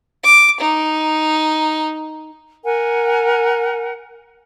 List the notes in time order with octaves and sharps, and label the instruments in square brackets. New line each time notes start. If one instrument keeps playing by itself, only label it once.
[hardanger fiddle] D6
D#4
[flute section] A#4 F#5 G#5